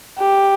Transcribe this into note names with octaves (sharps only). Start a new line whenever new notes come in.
G4